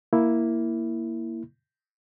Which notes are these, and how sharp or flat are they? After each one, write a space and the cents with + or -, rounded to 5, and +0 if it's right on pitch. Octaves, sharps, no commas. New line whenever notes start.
A#3 +0 E4 +0